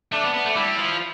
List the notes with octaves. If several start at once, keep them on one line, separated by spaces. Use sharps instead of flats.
A3 D4
B3
B3
A3
G3 E4
F3